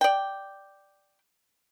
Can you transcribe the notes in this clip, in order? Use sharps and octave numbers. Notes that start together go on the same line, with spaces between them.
D5 G5